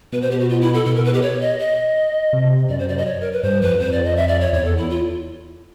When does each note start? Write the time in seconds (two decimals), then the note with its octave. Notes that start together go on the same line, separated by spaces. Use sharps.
0.13 B2 B4
0.22 C5
0.31 G4
0.40 F#4
0.49 F4
0.61 E4
0.74 A4
0.86 B2 A4
0.95 A#4
1.05 B4
1.13 G4
1.22 C#5
1.41 D#5
1.59 D#5
2.33 C3
2.69 F#2 D5
2.79 C5
2.88 D5
2.98 D#5
3.06 C#5
3.21 A#4
3.32 B4
3.43 G2 C5
3.62 F2 B4
3.79 F2 C5
3.92 D5
4.05 D#5
4.17 E5
4.28 D5
4.40 C#5
4.53 E2 C#5
4.65 A4
4.77 E4
4.90 F4